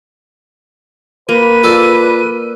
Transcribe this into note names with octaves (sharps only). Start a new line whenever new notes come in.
A#3 B4 D#7
F4 A4 D5